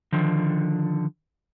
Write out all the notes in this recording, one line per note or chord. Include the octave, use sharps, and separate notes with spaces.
D3 D#3 F3